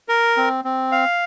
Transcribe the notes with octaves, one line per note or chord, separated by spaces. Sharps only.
A#4
C4
C4
F5